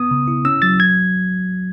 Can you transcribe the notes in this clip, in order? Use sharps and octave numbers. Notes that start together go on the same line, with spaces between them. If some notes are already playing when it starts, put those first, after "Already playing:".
Already playing: B3 D#6
C#3
E4
C#4 E6
F#3 A6
G#6